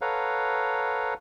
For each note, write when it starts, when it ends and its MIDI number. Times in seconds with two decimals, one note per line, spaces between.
0.01 1.14 69
0.01 1.14 71
0.01 1.14 73
0.01 1.14 77
0.01 1.14 78
0.01 1.14 82